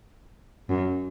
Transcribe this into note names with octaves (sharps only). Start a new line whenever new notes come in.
F#2